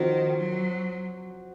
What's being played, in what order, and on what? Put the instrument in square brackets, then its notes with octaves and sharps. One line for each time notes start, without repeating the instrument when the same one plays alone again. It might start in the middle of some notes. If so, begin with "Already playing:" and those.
Already playing: [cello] D#3 [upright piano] F3 C4 F#4
[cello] F#3